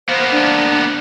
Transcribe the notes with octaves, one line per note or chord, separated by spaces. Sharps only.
A#3 B3 C5
D4